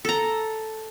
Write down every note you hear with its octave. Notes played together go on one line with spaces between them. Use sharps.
A4 A#5